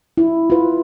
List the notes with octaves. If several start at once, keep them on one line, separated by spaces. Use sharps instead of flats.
E4
F4 B4